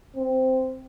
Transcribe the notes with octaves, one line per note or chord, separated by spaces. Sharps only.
C4